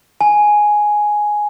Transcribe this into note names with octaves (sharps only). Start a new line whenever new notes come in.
G#5